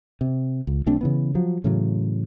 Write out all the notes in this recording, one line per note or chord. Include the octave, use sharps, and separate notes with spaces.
C3
C#2
B1 A3 C4 D4
C#3 E3 B3
F3 F#3
A2 C#3 E3 F#3